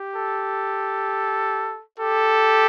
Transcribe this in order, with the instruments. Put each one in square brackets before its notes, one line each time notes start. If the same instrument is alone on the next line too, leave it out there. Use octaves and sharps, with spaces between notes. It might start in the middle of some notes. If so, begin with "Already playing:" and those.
Already playing: [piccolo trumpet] G4
[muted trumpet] A4
[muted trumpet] G4 [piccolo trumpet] A4